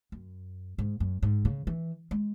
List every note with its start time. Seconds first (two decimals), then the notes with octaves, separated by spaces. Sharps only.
0.12 F#2
0.78 G#2
1.00 F#2
1.23 G#2
1.45 C#3
1.67 E3
2.11 G#3